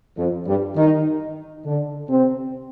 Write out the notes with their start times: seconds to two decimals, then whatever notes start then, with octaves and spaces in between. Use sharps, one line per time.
0.17 F2 F3
0.46 G2 G3
0.75 D#3 D#4
1.64 D3 D4
2.08 C3 C4